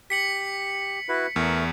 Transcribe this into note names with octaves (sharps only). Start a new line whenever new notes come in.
G4 B6 C#7 F#7
E4 F#4 B4
E2 A3 A#4 C#6